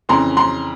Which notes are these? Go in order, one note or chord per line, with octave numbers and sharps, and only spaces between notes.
F2 C#3 E3 A#5 C6
A#5 C6